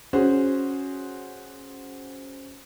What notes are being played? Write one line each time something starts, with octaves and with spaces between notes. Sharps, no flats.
C#4 F#4 G#4 C5